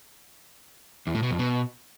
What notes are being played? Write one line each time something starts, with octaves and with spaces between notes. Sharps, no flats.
E2
A2
B2
F2
B2